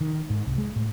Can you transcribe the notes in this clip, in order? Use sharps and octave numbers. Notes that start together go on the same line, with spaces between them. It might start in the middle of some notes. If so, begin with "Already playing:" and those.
D#3
G#2
C2
G#3
A2